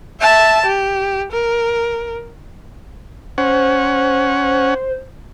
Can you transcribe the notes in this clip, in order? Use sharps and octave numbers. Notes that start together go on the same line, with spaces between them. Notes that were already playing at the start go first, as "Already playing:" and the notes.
E5 A5
G4
A#4
C#4 C5 F#5